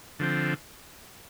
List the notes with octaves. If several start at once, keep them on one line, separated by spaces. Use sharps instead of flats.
D3 F3 C4